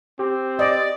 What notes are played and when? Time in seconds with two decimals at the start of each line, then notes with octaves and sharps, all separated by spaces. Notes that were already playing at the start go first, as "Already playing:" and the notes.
0.19 C4 G4
0.59 D5 D#5